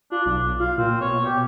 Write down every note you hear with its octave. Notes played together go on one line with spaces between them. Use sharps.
D4 F4
B1 D4
F4 F5
A#2 C4
B2 C#5
B2 G4